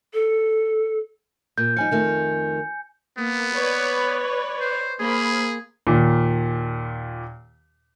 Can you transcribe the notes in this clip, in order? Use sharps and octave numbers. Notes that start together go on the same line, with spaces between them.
A4
A#2 G6
F3 G3 D#4 G#5 C#7
F2 D#3 A3
A#3 B3
B4 C#5 D5
C5
A#3 G#4 C5 B5
D#2 A#2